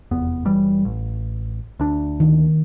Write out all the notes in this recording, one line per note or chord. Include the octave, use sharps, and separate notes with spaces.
F1 E2 B3
F#1 E3 G3
A1
D2 D4
D#3